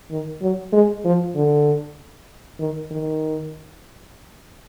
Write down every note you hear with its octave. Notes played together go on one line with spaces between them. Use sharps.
D#3
F#3
G#3
F3
D3
D#3
D#3